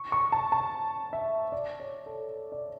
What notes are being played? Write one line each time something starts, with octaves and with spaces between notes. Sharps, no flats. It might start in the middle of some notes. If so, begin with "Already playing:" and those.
Already playing: C#6
C#6
A5
A5
E5
D5
C#5
A4
D5